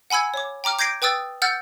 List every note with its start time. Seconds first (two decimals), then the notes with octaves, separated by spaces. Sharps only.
0.10 F#5 G#5 B5 E6 G#6
0.34 C#5 D6
0.64 G5 A#5 D6 F6
0.79 D6 G6 G#6 A#6 C7 D7
1.02 B4 G5 D#6 E6 A6
1.42 F#5 E6 F6 G6 A6